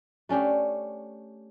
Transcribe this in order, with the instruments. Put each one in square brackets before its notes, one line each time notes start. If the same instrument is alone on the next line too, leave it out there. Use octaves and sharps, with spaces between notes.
[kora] A3 C#4 D4 G4